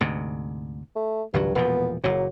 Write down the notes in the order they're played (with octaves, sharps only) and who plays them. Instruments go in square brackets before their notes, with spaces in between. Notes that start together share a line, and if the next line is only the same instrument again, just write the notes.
[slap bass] D2 G#2 C3
[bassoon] A3
[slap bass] G#1 C#2 F#3 [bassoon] G2
[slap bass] E1 A#2 F3 [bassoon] B3
[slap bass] F#1 A#2 [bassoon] F#3